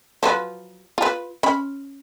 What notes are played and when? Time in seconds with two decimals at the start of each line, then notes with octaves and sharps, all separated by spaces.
0.23 F3 F#3 B4
0.98 F4 B4
1.43 C#4 B5